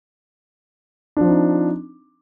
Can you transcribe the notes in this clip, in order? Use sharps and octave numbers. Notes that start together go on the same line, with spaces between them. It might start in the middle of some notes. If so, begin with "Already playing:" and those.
F3 C4 D4 D#4